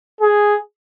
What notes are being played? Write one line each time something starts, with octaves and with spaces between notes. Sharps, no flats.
G#4